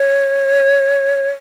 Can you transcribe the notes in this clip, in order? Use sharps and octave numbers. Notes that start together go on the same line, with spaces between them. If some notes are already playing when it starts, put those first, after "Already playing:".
Already playing: C#5